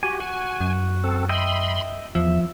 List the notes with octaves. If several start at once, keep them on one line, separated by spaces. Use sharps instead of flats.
F#4 G4 G#5
F#4 G#5
F#2
C4 A4
D#5 E5 G5 B5 C6
E2 F3 E5